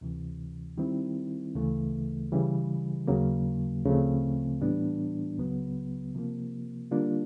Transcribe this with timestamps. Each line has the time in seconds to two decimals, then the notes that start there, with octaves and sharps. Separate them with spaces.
0.01 D2 C3 E3
0.78 D#3 G3 C4 E4
1.55 D2 C#3 E3 A3
2.32 C#3 E3 G3
3.07 D#2 C#3 F#3 A#3
3.85 D2 C#3 F3 A3 C4
4.61 A2 E3 G3 B3 D4
5.38 C#2 C#3 F#3 B3
6.15 C3 F3 A#3
6.91 D3 G3 A#3 D4 F4